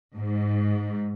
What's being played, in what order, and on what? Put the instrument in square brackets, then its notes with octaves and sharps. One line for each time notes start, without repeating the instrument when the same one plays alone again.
[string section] G#2